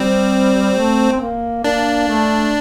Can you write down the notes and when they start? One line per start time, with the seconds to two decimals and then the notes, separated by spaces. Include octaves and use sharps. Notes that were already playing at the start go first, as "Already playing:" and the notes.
Already playing: G3 C4
0.75 A3
1.11 C4
1.20 A#3
1.64 A#3 D4
2.08 A3